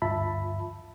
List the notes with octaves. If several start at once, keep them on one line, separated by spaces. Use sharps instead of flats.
D2 G2 F4 E5 A5 B5